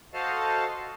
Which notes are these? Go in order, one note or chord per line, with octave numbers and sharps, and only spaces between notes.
F#4 A4 C5 D#5 F5 A5